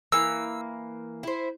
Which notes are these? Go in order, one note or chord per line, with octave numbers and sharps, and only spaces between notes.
E3 A#3 E6
E4 C5